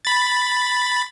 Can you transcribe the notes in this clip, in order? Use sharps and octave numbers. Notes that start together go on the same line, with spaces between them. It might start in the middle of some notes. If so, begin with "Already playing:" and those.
B5 A6